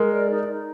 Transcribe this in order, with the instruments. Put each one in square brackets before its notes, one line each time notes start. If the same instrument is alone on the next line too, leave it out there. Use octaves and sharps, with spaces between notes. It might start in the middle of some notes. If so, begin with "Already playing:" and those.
Already playing: [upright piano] G#3 [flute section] A#4
[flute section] D5
D#4
D#4